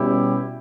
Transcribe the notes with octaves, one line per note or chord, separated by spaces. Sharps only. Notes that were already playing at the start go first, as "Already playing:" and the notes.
Already playing: B2 G3 C#4 E4 G4